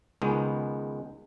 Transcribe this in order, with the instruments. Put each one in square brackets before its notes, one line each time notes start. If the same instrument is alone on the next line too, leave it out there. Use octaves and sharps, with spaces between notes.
[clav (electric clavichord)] C#2 D#3 G#3 B3